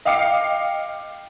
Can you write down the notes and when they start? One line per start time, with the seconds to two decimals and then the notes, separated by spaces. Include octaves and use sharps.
0.05 D#5 F5 G5 D6 C7 C#7